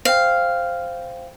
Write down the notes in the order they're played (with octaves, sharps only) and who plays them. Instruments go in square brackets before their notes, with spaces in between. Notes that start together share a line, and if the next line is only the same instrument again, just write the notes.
[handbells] C5 G5 [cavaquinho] F5